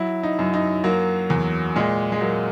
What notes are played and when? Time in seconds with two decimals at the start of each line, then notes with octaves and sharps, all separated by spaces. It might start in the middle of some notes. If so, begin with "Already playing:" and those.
Already playing: F#3 E4
0.23 D#4
0.39 F#2
0.54 D#4
0.84 F#3 A#3
1.30 E2
1.76 A#2 G#3
2.12 G#3
2.21 F#3 A#3